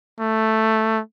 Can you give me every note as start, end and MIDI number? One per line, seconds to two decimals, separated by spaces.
0.20 1.00 57